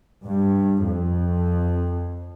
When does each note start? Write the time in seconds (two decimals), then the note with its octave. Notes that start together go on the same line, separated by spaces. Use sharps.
0.24 G2
0.85 F2